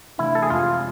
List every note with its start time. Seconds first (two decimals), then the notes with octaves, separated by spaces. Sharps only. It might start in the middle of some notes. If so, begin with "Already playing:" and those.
0.18 C3 E3 A3 D4 E4
0.35 A4
0.43 G#4
0.50 F2 C3 G#3 C4 F4